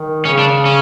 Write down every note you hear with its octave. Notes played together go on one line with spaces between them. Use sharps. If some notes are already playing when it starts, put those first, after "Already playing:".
Already playing: D#3
C#3 C#4
D4
C#4